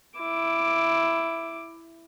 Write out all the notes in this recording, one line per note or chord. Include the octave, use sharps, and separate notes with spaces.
E4 D6